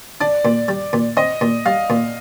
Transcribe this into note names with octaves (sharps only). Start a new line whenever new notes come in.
D4 D5
A#2
G3
A#2
C4 D#5
A#2
G3 F5
A#2